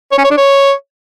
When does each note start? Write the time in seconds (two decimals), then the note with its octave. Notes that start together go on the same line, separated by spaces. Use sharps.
0.12 C#5
0.18 C#4
0.24 C#5
0.31 D4
0.37 C#5